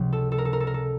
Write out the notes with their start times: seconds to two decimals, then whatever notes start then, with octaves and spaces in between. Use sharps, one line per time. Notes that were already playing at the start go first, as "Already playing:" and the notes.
Already playing: C#2 C3 F3
0.13 A4
0.32 A4
0.38 A#4
0.45 A4
0.53 A#4
0.60 A4
0.67 A#4
0.74 A4